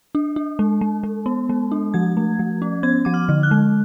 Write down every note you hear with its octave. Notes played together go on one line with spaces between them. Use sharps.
D4
D4
G#3
G#3
G#3
B3
G#3
D4
F3 G#6
A3
F3
C#4
B3 G#6
F3 D6
F6
D3
F#6
G#3